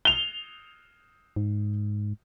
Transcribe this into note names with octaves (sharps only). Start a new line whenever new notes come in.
F7 G7
G#2